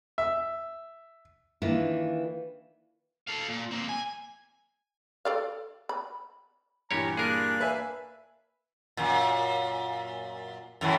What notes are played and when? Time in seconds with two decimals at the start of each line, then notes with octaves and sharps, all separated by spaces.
0.18 E5
1.62 D#3 E3 A#3 D4 E4 F4
3.28 A4 F5
3.49 A#2
3.71 A#3 C4
3.89 G#5
5.25 A4 D5 F5
5.89 B5
6.91 G2 A#2 E3 G4 C#5 A#5
7.17 A#3 D4 G#4 A#4 F5 F#6
7.60 B4 E5 G#5
8.97 F#2 A#2
10.81 F#2 A2 E3